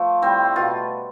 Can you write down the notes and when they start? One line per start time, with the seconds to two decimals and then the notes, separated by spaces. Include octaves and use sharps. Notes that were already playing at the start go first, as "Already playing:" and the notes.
Already playing: F3 A3
0.22 A2 G3 C4
0.56 B2 A3 F4